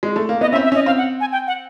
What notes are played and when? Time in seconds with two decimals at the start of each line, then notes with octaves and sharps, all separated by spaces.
0.03 G#3
0.16 A3
0.29 A#3
0.41 B3 D#5
0.52 C#4 E5
0.56 C4
0.64 E5
0.72 C#4 D#5
0.86 C4 F5
0.98 F#5
1.20 G#5
1.32 G5
1.47 F#5